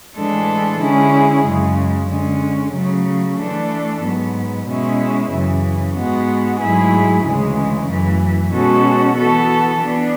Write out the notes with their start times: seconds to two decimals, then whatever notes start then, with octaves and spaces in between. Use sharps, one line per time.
0.16 A2 E3 G#3 D4 A4
0.80 D3 G#3 C#4 E4 G#4
1.45 F#2 C#3 G#3
2.09 D3 G#3 C#4
2.73 C#3 F#3 A3
3.37 E3 A3 D4 A4
4.02 G#2 F#3 B3
4.66 B2 G#3 C#4 E4
5.31 F#2 C#3 E3
5.95 G#2 G#3 B3 F#4
6.59 G#2 F#3 A3 E4 G#4
7.24 D2 C#3 E3 G#3
7.88 F#2 E3 A3
8.52 B2 G#3 C#4 F#4 A4
9.17 E3 B3 F#4 A4
9.81 E3 B3 D4